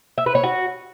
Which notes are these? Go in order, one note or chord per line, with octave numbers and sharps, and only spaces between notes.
E5
B4
C#5
F#4